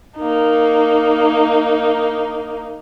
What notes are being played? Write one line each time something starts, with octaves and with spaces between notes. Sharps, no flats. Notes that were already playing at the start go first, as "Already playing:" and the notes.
A#3 D#4